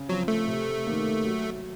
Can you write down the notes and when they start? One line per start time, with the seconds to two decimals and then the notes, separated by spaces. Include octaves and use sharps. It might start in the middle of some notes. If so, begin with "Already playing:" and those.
Already playing: C#3
0.09 F3 F#3 C4
0.28 A3
0.48 C3
0.87 D#3 A#3
1.25 F#3